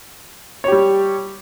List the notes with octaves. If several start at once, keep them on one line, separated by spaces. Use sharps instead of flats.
G3 G4 C#5